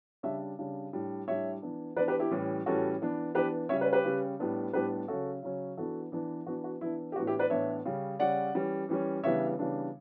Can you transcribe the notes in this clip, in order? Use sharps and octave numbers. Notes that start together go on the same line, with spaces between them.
C#3 G3 D4 C#5 E5
C#3 G3 D4
A2 G3 D4
A2 G3 D4 C#5 E5
E3 B3 D4
E3 B3 D4 B4 D5
G4 B4
E4 G4
A2 E3 G3 C#4
A2 E3 G3 C#4 F#4 A4
E3 B3 D4
E3 B3 D4 G4 B4
C#3 G3 C#4 C#5 E5
B4 D5
G4 B4
C#3 G3 C#4
A2 G3 B3 D4
A2 G3 B3 D4 G4 B4
C#3 F#3 C#4 F#4 A4
C#3 F#3 C#4
E3 B3 D4 F#4 A4
E3 B3 D4
E3 B3 D4 F#4
F#4
E3 B3 D4 E4
G4
A2 E3 B3 D4 F#4
E4 G4
B4 D5
A2 E3 B3 D4 C#5 E5
C#3 G3 C#4
C#3 G3 C#4 D5 F#5
E3 G3 C#4
E3 G3 C#4
C#3 E3 G3 B3 D4 C#5 E5
C#3 E3 G3 B3 D4